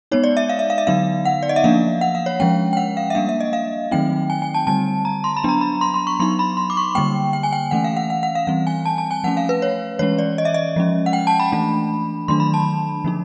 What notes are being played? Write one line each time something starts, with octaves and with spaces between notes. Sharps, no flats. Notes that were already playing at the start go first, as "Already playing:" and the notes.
G#3 B3 D#4 C#5
D5
E5
F5
E5
F5
E5
D3 F#3 B3 D#4 F5
F#5
D5
D#5
E5
F3 A#3 D4 F5
F#5
F5
C#5
F3 G#3 C#4 G5
G5
F#5
F5
E5
G3 A#3 D4 F5
E5
D#5
F5
D#3 F#3 A3 C4 D#4 G5
G#5
G#5
A5
D3 G3 C4 A5
A#5
C6
B5
F#3 B3 D4 A#5
B5
C6
C6
C#6
F#3 B3 D#4 C6
B5
C6
D6
C#6
D3 G3 A#3 G5
G5
G#5
G5
E3 A3 C#4 F#5
F5
F#5
F#5
F#5
F5
E3 G3 C4 F5
G#5
A5
A5
G#5
F3 A3 C#4 F#5
F5
B4
C#5
E3 G#3 C#4 C#5
D5
D#5
E5
D#5
F3 G#3 C#4
F#5
G5
A5
B5
E3 A3 D4
D#3 F#3 A3 D4 C6
B5
A5
D3 F3 A#3 D#4